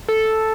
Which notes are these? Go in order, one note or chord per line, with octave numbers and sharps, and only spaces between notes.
A4